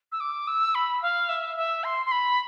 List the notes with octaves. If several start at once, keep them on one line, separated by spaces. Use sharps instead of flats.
E6
D6
E6
B5
F5
E5
E5
C6
C6
B5